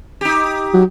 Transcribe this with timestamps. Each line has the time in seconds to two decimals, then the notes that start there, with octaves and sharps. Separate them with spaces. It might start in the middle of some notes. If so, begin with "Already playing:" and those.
0.21 D#4 G4
0.74 F#3